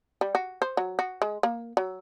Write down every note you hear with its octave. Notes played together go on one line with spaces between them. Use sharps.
G3
F#4
C5
F#3
F#4
G#3
A#3
F#3